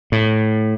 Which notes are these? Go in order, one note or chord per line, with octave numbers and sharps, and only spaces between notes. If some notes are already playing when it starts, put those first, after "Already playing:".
A2